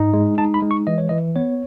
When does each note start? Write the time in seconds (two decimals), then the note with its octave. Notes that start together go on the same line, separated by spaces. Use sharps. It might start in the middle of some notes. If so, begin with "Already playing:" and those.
Already playing: G#2 D#4
0.13 G#3
0.38 D#4 A5
0.54 B5
0.62 G#3
0.71 C#6
0.87 E3 D#5
0.98 C#5
1.09 E3 D#5
1.36 B3 C#5